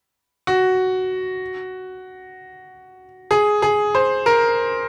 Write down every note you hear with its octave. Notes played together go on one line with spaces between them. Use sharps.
F#4
G#4
G#4
C5
A#4